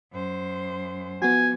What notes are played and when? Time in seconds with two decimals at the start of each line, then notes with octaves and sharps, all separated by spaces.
0.12 F#2 C5
1.22 F3 B3 F#4 G#5